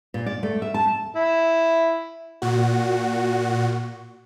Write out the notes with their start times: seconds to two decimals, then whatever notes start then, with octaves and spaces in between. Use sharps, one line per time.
0.14 A#2
0.26 D5
0.43 A3
0.62 E5
0.74 A5
1.16 E4
2.42 A#2 F#4